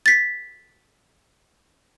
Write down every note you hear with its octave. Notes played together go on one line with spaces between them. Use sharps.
A6 B6